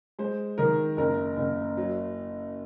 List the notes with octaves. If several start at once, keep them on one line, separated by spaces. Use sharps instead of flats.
G#3 C5
D#3 A#4
F#1 A#4
F#1
F#3